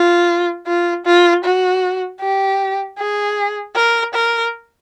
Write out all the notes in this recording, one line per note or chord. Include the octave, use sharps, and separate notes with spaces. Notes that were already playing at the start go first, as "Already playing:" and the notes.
Already playing: F4
F4
F4
F#4
G4
G#4
A#4
A#4